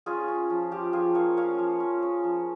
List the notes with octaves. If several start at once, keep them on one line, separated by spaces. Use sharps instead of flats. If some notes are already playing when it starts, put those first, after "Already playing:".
C#4 F4 G#4
C#4
F3
F3 G4
F3 F4 G#4
A#3 C#5 F5
C#4 C#5 F5
F3
C#4
C#4
F3